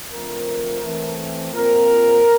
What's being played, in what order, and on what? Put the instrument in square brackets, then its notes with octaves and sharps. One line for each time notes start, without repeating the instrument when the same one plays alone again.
[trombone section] D3 F3 A3 C4 A#4
E3 A3 C4
A#2 F3 C4 A#4